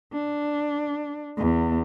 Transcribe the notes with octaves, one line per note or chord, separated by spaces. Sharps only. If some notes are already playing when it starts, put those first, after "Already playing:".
D4
E2